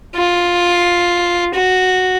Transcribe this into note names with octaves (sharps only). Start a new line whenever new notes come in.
F4
F#4